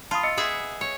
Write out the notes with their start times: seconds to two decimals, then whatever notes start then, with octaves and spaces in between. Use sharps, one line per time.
0.11 F4 A5 B5 D#6
0.23 D#5 E6 C#7
0.37 B3 G#4 E5
0.81 C#5